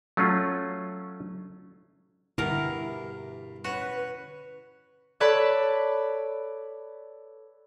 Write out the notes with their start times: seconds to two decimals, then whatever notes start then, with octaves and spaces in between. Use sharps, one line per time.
0.17 F#3 A3 C#4 F4
2.38 G2 B2 D3 E4 G4 A#4
3.64 C#4 F#4 B4
5.20 A4 B4 C#5 D5 A5 B5